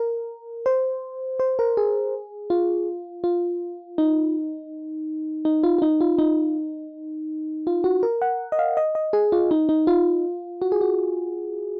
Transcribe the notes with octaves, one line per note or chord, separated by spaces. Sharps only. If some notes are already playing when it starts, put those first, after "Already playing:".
Already playing: A#4
C5
C5
A#4
G#4
F4
F4
D#4
D#4
F4
F4
D#4
F4
D#4
F4
F#4
A#4
F#5
D#5
F5
D#5
D#5
G#4
F4
D#4
D#4
F4
F#4
G#4
F#4